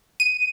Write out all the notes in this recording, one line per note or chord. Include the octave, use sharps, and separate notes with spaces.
D#7